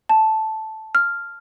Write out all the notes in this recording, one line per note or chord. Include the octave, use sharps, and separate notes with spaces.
A5
F6